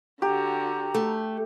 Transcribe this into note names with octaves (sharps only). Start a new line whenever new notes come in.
D3 F#4 G4 A#5
A3